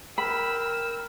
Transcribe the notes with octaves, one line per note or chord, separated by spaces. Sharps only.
A#4 G5 B5 E6